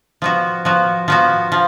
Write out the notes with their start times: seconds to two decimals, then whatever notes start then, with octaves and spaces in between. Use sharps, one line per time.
0.22 F3 B3 F#4
0.65 F3 B3 F#4
1.08 F3 B3 F#4
1.52 F3